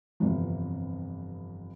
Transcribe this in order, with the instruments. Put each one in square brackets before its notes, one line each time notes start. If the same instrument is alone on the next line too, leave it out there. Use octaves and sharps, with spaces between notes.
[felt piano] G1 F2 C3 E3 F3